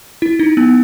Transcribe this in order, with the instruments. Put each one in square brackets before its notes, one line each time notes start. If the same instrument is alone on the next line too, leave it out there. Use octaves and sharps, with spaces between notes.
[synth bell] E4
D#4
B3